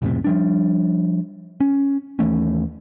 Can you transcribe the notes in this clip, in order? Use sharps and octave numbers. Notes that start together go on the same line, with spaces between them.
B1 F2 A2 C3
F3 G3 D4
C#4
D#2 E3 A3 C#4